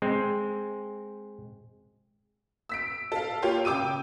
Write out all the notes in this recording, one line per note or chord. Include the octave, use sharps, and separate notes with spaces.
G#3 C4
E6 B6 D7
A4 F5
A#3 F4 G4 C#5
C#3 G5 D6 E6 D#7